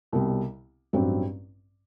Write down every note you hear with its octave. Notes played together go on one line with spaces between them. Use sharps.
C2 B2 G3
A1 G2 F#3 C4